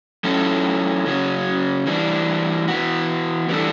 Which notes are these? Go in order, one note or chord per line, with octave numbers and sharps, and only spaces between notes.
F#3 C#4 E4 A4
C#3 F#3 C#4
E3 G3 D4
E3 B3 F#4
E3 G3 D4 A4